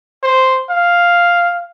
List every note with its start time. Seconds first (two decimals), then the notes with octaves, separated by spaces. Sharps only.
0.23 C5
0.69 F5